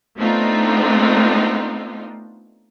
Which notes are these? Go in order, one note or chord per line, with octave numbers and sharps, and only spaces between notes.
A3 B3 C4 D4 D#4 F4